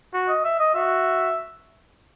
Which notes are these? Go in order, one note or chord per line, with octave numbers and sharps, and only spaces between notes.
F#4
D#5
E5
D#5
F#4 E5